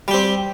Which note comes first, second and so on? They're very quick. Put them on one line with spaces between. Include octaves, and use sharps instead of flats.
G3 G4 C4